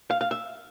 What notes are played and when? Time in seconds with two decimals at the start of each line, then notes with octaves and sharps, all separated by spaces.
0.11 F5
0.21 F5
0.31 E5